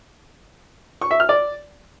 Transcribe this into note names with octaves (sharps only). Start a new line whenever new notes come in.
C#6
E5
F6
D5